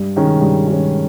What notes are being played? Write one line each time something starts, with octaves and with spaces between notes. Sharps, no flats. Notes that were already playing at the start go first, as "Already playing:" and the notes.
Already playing: G2
D#3 G#3 C#4
G2
D#3 G#3 C#4